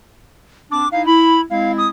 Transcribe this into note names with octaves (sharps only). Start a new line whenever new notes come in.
C4 D4 D6
D#4 E4 F5
E4 B5
G#3 C4 E4 F5
D#6